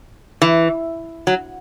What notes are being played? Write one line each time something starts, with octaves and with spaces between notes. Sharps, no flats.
E3
F#3